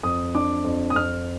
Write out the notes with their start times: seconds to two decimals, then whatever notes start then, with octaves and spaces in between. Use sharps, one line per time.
0.03 F2 D#6
0.35 D4 D6
0.64 F2
0.90 D#6
0.95 F2 F6